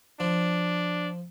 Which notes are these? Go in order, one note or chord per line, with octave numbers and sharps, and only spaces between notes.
F3 D4